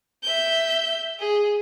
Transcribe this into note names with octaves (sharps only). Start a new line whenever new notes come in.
E5 G6
G#4